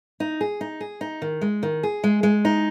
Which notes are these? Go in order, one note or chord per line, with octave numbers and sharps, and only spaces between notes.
D#4
G#4
D#4
G#4
D#4
D#3
G#3
D#3
G#4
G#3
G#3
D#4